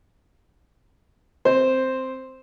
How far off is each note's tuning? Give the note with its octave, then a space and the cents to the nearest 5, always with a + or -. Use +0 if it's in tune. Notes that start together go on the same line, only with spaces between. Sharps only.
C4 +0 C5 +0